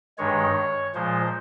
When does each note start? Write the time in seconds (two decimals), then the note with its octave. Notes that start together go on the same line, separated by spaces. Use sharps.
0.18 G2 D#3 G#3 C#5
0.95 A#2 F3 G#3 C5